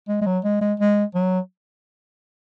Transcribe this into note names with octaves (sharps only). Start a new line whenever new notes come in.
G#3
G#3
F#3
G#3
G#3
G#3
F#3